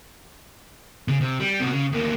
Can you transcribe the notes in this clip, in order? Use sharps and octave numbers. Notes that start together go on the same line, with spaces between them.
C#3 C#4
C3
G3
C3 F#4
C#3
D2 A#3